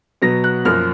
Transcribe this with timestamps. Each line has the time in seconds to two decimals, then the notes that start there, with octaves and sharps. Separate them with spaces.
0.22 B2 F#3 B3 A#6
0.44 F#6
0.65 F#2 F3 A#3 F6